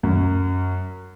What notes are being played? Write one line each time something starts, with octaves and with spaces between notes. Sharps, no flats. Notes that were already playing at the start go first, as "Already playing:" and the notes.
F#2